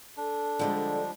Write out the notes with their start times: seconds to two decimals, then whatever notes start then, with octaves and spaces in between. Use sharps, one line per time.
0.17 D4 A4
0.59 D3 F3 G3 G#3